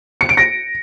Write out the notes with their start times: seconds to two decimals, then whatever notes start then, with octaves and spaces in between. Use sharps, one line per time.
0.21 C#7
0.29 D7
0.37 A#6